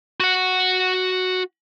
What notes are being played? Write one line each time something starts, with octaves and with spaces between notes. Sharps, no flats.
F#4 F#5